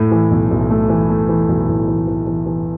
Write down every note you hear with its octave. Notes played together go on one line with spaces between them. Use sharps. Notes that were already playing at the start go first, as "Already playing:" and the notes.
Already playing: A2 A3
E3
B1
B1
A3
E3
A3
E3
B1
A2
E3
E3
E3
E3